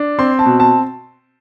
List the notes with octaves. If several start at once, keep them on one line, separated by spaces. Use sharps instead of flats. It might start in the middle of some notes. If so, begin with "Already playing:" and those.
Already playing: D4
C4 C6
A5
B2
A5